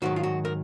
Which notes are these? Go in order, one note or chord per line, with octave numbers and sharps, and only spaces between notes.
G#2 D#3 F#3 F#4
F4
F#4
A#4